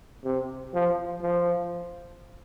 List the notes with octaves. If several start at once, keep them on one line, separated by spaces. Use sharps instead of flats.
C3
F3
F3